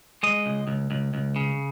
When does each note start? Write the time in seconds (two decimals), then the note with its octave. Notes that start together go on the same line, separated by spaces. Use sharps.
0.23 G#3 D#5
0.46 C#2
0.68 C#2
0.91 C#2
1.14 C#2
1.36 C#3